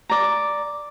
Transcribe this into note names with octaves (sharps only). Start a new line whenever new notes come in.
D5 A#5